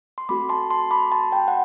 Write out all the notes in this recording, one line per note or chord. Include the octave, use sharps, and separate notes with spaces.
C6
A3 C4 F#4 A4 B5 D6
A5 C6
A5 C6
B5 D6
A5 C6
G5 B5
F#5